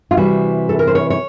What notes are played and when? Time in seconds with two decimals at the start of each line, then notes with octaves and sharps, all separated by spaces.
0.11 F4
0.17 C3 E3 G3 F#4
0.69 A4
0.79 A#4
0.87 C5
0.95 C#5
1.10 C#5